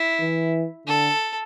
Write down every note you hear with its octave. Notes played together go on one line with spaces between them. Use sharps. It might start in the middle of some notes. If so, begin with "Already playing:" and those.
Already playing: E4
E3
D3 A4